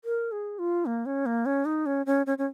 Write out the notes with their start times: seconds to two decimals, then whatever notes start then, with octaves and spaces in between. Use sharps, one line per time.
0.05 A#4
0.32 G#4
0.59 F4
0.86 A#3
1.06 C#4
1.26 A#3
1.46 C#4
1.65 D#4
1.86 C#4
2.06 C#4
2.26 C#4
2.38 C#4